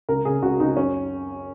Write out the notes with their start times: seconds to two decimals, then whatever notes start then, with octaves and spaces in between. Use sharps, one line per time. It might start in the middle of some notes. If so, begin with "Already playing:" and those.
0.09 C#2 A#4
0.25 C#3 G#4
0.42 C#2 F#4
0.60 C#2 D#4
0.77 F#2 C#4